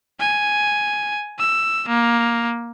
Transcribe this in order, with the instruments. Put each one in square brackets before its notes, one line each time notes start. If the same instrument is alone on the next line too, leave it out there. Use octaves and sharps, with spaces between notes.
[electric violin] G#5
E6
A#3